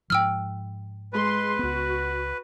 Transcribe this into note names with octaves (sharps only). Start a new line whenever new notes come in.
G#2 F3 G5 E6 F6
G#3 B4 C6
C#2 B3 F#4